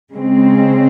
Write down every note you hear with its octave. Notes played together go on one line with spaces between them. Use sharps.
C#3 G#3 C4